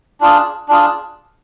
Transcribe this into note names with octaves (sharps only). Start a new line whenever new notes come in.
D4 F4 G#4
D4 F4 G#4